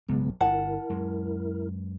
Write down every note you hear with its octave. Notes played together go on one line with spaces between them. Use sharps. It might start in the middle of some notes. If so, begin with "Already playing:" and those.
B1 G2 C#3 G#3 B3
D1 G1 E4 A#4 F#5 A5
F#2 G#3